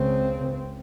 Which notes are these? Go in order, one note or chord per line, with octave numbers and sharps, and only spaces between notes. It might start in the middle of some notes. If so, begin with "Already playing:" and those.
Already playing: C#2 C#3 C4